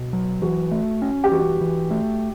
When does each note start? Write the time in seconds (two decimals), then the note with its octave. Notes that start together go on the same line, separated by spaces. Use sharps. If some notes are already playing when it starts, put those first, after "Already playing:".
Already playing: B2
0.13 F#3
0.42 E3 F#4
0.71 A3
1.02 C#4
1.24 G4
1.31 E3 F#4
1.61 E3
1.91 A3